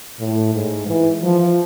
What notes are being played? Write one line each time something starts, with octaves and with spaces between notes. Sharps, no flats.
A2
G#2
E3
F3